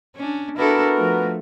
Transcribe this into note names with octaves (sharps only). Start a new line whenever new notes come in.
C#4 D4
B3 D4 E4 F#4 A4 A#4
F3 A3